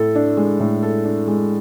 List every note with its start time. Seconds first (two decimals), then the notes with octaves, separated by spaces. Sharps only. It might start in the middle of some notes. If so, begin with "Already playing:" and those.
Already playing: A2 A4
0.15 D4
0.37 G#3
0.60 A2
0.83 A4
1.05 D4
1.28 G#3